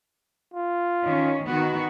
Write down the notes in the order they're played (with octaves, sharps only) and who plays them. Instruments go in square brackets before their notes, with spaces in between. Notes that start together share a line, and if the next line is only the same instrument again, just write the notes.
[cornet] F4
[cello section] D#3 C#4
D#3 B3 F#4